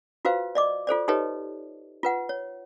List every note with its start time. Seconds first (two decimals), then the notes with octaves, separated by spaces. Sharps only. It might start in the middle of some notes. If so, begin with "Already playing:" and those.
0.25 F4 F#4 B4 C5 F5
0.55 D5 D#5 D6
0.87 F4 A4 C5 D5
1.08 D#4 G4 A4 B4 C#5 D#5
2.03 F4 B4 F#5
2.29 C#5